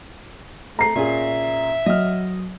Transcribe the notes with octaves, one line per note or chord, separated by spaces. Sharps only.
A3 A#5 C7
A#2 C#4 G#4 E5
F#3 D#5 F6